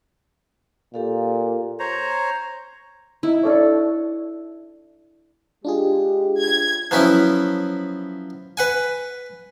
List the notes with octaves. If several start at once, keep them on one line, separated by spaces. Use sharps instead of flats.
A#2 G4 A4 F5
C5 C#5 A#5
D#4 E4
D4 A4 C#5
G#3 D4 F4 G4 G#4
G#6
F3 F#3 B3 C#4 E4
B4 F#5 G#5